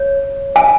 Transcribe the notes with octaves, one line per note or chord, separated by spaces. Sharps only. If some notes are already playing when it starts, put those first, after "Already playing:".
Already playing: C#5
G#5